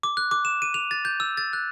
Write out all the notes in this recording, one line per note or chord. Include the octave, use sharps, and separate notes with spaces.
D6
F#6
D6
E7
D#7
F7
A6
G6
E6
A6
F#6